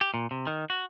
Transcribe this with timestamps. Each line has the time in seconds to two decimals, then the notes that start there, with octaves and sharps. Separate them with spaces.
0.01 G4
0.14 A#2
0.31 C3
0.47 D#3
0.70 F#4